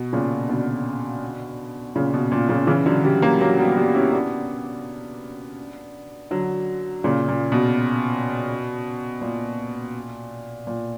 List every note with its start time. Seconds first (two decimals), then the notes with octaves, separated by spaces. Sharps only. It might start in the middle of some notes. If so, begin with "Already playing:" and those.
Already playing: B2
0.13 A#2 C#3
0.49 B2 D3
1.96 A#2 C#3
2.14 B2
2.32 A#2
2.49 A#2 C#3
2.67 C#3 E3
2.86 D3 F#3
3.04 E3 G3
3.22 F#3 A#3
3.41 F#3 A#3
3.59 G3 B3
3.77 G3 B3
3.95 C#4 E4
4.13 B3 D4
6.31 D3 F#3
7.04 A#2 C#3
7.28 A#2
7.52 B2
9.21 A#2
10.67 A#2